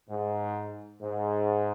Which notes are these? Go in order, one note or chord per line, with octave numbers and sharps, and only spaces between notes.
G#2
G#2